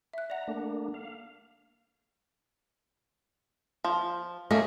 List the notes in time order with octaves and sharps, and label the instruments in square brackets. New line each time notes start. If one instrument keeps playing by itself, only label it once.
[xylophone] E5 F#6
[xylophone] D5 F#5 [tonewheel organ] A#5
[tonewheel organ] A3 A#3 D4
F5
[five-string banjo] F3
[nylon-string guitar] A3 [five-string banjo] A#3 C#4 D#5